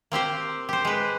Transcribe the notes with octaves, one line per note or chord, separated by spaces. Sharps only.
A#3 C4 G4 C5
G4 C5
G#3 B4